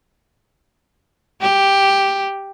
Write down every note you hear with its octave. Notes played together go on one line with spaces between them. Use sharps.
G4